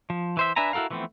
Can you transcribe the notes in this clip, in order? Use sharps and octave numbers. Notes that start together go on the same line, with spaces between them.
F3
E3 C5 E5
D4 B4 E5 G#5 A#5
E4 F#4 A4 A#4 F5
E3 F3 A3 B3 C4